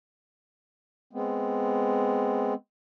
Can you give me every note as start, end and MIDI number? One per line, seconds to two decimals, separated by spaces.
1.13 2.54 56
1.13 2.54 59
1.13 2.54 60